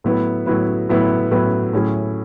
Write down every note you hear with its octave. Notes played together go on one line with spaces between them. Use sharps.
A2 F#3 B3 E4 B4
A2 F#3 B3 E4 B4
A2 F#3 B3 E4 B4
A2 F#3 B3 E4 B4
A2 F#3 C#4 E4 G#4